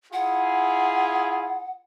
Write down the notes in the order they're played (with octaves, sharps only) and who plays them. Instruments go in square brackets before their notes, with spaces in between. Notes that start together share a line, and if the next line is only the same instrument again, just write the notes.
[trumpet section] E4 F4 G#4 [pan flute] F#5